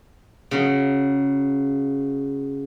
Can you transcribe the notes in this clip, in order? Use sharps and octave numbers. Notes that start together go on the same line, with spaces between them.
C#3 F#3